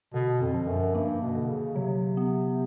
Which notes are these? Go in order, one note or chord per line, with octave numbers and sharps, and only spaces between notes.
B2 D3
F2
F3
F#2
G2 A#3
B2
D3
C#3
C3 F#3
B3